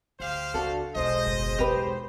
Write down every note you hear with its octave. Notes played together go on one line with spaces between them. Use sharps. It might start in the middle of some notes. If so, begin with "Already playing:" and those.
D2 G4 C5 F5
C#2 D4 F#4 A4
E1 B1 E2 G#3 C5 D#5
F#1
E2 G4 B4